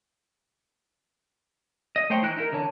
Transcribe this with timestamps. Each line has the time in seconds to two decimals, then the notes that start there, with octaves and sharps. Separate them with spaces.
1.96 D#5
2.10 A3 C5 C#5 G5
2.22 E3 D#4 E4 F#6
2.37 D#4 E4 A#4
2.52 D3 E3 C#5 A5